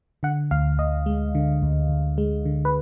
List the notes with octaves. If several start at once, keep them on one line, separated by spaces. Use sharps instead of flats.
D3 F#5
D2 F5
D2 D#5
G#3
D3
D2
D2
G#3
D3
B4